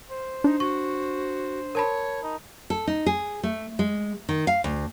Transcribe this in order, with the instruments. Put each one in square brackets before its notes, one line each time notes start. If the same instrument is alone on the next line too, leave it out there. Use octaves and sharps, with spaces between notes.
[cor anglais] C5
[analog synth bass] D4 [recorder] D#4
[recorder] F#4 [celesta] C#6
[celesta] A#4 A5 B5 [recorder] C#5
[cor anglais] D#4
[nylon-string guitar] A4
D#4
G#4
A3
G#3
D#3
F5
D2